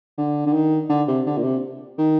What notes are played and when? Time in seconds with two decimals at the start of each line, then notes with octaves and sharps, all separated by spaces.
0.17 D3
0.46 D3
0.53 D#3
0.89 D3
1.08 C3
1.26 D3
1.37 A#2
1.43 C3
1.98 D#3